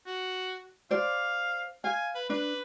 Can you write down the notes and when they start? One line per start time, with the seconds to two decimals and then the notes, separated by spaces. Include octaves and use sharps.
0.06 F#4
0.91 C5 D5 F5
1.84 F5 G#5
2.15 B4
2.30 D4 B4